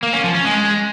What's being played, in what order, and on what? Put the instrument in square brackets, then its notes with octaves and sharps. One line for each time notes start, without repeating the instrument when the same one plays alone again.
[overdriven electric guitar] A#3
C#4
F3
C#4
G#3